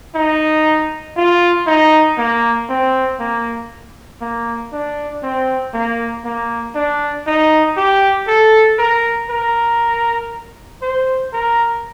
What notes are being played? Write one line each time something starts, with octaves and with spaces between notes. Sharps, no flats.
D#4
F4
D#4
A#3
C4
A#3
A#3
D4
C4
A#3
A#3
D4
D#4
G4
A4
A#4
A#4
C5
A#4